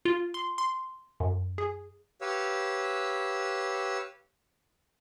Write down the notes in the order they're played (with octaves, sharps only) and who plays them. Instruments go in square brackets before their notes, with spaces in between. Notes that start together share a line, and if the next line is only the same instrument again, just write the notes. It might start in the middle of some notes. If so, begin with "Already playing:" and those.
[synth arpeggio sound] F4
C6
C6
F#2
G#4
[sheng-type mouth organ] G4 B4 C#5 F5 E6